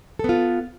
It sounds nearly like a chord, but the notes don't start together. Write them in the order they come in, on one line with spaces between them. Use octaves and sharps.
A4 B3 F4